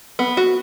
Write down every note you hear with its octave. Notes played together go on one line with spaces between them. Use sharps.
B3
F#4